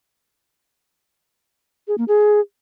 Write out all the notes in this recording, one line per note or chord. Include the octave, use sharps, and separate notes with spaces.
G#4
A#3
G#4